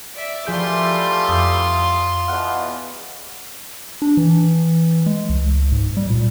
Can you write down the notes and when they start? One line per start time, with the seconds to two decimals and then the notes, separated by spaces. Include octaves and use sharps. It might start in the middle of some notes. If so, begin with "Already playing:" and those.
0.14 D5 E5
0.47 E3 F3 G3 A3 F4 G#4 C6 G6
1.29 F2 D#6
2.28 E2 B2 F5 F#5
4.02 D4
4.17 E3
5.06 G#3
5.29 C#2
5.72 G#2
5.97 G3
6.10 A#2